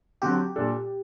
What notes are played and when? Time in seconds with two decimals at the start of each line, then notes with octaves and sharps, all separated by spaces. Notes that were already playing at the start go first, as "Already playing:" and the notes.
0.22 D3 F#3 C4 F#4 G4
0.56 A#2 G3 D4 A4